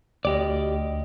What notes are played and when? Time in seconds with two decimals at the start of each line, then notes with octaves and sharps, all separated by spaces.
0.25 D2 G4 D5 D#5